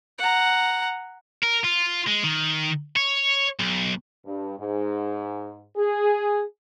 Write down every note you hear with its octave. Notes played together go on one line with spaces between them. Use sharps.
F#5 A#5
A#4
F4
G#3
D#3
C#5
B1
G2
G#2
G#4